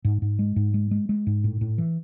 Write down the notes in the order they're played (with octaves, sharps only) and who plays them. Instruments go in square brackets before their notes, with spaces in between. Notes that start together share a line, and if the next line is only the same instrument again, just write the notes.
[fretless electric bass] G#2
G#2
G#3
G#2
G#3
G#3
G#3
G#2
A2
A2
E3